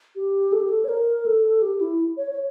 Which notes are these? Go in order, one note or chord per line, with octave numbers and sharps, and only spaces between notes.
G4
A4
G4
A4
C#5
A#4
A4
G4
E4
C#5
C#5